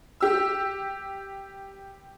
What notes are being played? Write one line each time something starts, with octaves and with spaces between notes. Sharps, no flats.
G4 E6